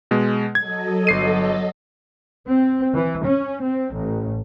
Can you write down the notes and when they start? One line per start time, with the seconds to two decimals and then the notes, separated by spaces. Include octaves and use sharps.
0.11 B2 G#3
0.55 F#3 A4 D#5 G#6
1.07 G1 C7 D#7
2.47 C4
2.94 E3
3.25 C#4
3.63 C4
3.93 A1